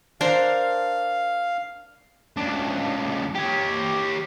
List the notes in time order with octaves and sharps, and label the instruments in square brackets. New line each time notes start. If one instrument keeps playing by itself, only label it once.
[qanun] D4 A#4 C5 [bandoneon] F5
[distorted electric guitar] C#2 D4
G4 C#5